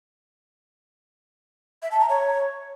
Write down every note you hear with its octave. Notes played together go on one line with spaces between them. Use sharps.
E5
A5
A#5
C#5